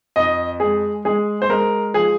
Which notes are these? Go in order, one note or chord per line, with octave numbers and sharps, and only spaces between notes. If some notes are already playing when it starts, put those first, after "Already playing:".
F2 D#5
G#3 G#4
G#3 G#4
C5
G#3 A#4
F3 G#4